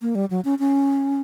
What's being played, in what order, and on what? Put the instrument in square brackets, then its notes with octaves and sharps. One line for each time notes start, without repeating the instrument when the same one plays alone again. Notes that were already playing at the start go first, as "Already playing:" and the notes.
[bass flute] A#3
G3
F#3
C#4
C#4